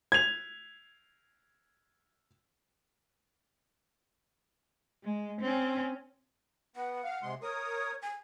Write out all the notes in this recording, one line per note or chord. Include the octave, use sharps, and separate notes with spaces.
G#6 F7
G#3
C4 C#4
B3 F#5
F5
C3 G#3 C6
A#4 C#5 D#6
G#5